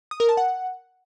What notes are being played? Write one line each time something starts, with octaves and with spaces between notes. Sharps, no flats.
D#6
A#4
A5
F#5